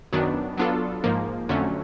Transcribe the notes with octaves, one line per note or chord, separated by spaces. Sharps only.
F#2 D#3 F#3 B3 D4
F#3 B3 D4 F4 A4
G#2 F3 A#3
F2 D3 F#3 A3 C#4